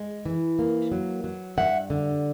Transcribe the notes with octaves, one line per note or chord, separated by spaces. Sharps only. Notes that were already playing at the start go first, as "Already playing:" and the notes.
Already playing: G#3
E3
A#3
F#3
F#3
G2 E5 F#5
D3